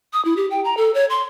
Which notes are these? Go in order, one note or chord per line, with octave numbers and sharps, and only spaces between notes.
D#6
E4
G4
G5
A#5
A4
C#5
C6